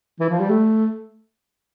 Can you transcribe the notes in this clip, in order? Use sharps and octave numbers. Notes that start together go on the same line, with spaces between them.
E3
F3
G3
A3